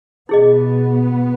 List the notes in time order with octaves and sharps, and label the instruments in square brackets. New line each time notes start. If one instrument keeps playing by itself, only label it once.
[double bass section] B2 B3 [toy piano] E4 G#4 D#5